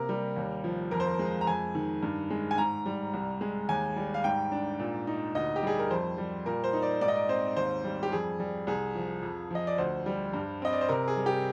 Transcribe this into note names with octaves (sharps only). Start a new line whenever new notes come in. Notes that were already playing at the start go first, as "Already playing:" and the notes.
Already playing: C3 A#3 A#4
G3
D#2
F3
F2 A#4
C5
A#4
G#3
A#5
F2 G#5
D#3
G2
G#3
G#5
G#2 A#5
G3
C2
G#3
D#2 G#5
G3
F5
G#2 G5
D4
A#2
D#4
D2 D#5
G4
G3 G#4
A#4
F2 C5
G3
A#2 A#4
C5
D#4
D5
G#2 D5
D#5
D5
C4 C5
D#2 C5
G3
G4
F2 G#4
G3
C2 G#4
F3
F2
F3 D#5
D5
D2 C5
G3
G2
C4 D#5
D5
C5
C3 A#4
G#4
G3
G4